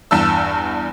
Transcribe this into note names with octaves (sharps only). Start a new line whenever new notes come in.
E2 G2 A5 E6